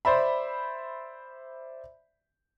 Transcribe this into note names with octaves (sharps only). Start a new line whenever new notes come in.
C5 D5 E5 B5